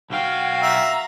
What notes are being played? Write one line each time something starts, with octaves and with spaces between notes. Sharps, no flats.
B1 F#4 F5 G5
E5 A#5